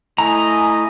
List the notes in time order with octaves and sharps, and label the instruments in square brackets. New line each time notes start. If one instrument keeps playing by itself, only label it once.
[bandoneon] A3 E4 [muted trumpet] D#5 [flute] G#5 [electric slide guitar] A#5